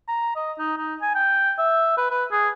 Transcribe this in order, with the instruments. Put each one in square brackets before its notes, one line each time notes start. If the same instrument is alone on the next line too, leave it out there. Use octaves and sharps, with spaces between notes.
[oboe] A#5
D#5
D#4
D#4
G#5
G5
E5
B4
B4
G#4